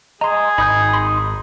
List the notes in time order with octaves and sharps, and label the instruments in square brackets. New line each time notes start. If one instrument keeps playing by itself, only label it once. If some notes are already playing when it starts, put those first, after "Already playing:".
[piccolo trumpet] G#4 [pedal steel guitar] D#5 [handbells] A#5 C6
[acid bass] G#1 [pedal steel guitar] D#4 D#6 G6 [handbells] B5
[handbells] B5 C6